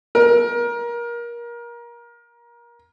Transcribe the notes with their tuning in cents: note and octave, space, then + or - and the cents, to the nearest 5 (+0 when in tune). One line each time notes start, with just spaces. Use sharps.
A#4 +25